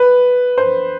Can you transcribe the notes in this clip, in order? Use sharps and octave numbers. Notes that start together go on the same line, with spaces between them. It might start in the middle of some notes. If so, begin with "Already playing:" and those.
Already playing: B4
C5